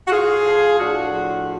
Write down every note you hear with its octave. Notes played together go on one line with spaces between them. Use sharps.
F#4
A2 F4 G#4
F3
A2 D4 F#4
F3